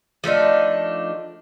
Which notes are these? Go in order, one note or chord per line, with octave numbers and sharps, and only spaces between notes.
F3 A3 D4 D#4